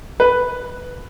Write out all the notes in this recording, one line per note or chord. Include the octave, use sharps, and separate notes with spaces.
B4